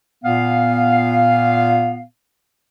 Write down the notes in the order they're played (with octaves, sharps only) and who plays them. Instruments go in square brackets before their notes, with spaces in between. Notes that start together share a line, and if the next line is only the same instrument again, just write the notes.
[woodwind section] A#2 B3 F5